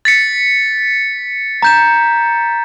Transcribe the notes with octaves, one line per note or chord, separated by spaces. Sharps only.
A6 B6 C#7
A#5 G6 E7